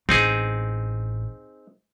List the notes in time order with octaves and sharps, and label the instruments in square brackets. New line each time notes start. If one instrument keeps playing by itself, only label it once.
[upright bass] A1 [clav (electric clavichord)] C4 D#4 G#4